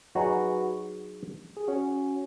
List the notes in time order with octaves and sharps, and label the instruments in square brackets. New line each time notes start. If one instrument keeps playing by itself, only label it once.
[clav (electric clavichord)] F#3 D#4 G#4 [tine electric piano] F#4 B4
[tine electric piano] G#4
C#4 F#4